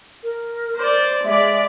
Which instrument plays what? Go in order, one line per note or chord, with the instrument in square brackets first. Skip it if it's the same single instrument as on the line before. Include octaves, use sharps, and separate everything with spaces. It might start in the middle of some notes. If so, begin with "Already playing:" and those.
[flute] A#4
[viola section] C5 D5
[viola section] G#3 D5 [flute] E5